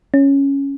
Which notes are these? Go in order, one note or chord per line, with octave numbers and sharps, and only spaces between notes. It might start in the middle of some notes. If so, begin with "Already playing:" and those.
C#4